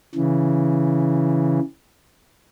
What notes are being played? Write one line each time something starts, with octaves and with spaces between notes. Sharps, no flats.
C#3 E3